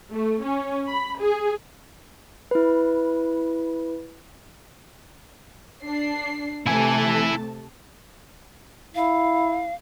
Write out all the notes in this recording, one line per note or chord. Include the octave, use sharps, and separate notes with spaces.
A3
C#4
B5
G#4
E4 B4
D4 C7
C3 A3 E4 G#5 A5
E4 F5